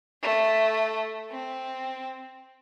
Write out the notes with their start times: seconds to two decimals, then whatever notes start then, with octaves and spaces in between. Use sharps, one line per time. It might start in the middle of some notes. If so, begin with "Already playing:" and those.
0.22 A3
1.31 C4